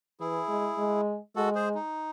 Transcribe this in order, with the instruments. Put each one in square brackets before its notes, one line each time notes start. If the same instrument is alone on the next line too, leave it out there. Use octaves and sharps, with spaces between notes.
[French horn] E3 [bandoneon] E4 G#4
[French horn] G#3
G#3
[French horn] G#3 [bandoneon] F#4 A4
[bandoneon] G#4 C5
D#4